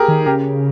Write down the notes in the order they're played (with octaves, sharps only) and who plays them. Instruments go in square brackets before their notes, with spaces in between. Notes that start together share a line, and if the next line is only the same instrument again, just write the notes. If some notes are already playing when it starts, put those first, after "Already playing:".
Already playing: [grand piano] G4 G#4 A#4
[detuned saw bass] D#3
[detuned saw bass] C#3 [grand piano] G4 A#4